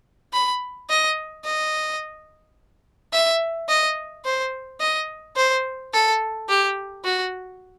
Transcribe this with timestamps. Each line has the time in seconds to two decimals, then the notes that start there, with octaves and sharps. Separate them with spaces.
0.33 B5
0.90 D#5
1.45 D#5
3.13 E5
3.69 D#5
4.25 C5
4.81 D#5
5.36 C5
5.93 A4
6.49 G4
7.05 F#4